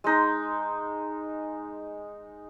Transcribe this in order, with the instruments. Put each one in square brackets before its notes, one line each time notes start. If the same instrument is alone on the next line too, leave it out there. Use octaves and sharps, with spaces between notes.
[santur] G#3 D#4